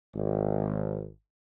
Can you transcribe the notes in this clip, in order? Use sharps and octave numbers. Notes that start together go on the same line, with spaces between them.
G#1